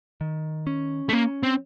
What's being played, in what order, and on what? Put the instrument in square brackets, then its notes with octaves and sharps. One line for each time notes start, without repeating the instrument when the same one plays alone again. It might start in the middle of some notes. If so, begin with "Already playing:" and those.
[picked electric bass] D#3
C#4
[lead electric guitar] A3
[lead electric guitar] A#3 [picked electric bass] C#4
[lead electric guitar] C4